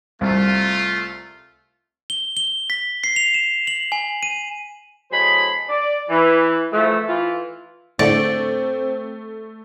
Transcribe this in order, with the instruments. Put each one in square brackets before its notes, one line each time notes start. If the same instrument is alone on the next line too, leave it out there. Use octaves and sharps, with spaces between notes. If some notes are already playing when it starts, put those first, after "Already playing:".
[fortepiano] C2 [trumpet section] A3 F4
[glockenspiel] G7
G7
B6
C7
F7
E7
F#7
G#5
D#7
[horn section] A2 F#3 G#4 C5 D#5 B5
D5
E3
E3 F3 A3
E3 F4
[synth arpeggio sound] A2 D3 C#7 [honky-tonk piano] A3 [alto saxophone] C4 [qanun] D5